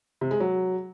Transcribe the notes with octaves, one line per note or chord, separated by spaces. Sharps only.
C3
G#3
F#3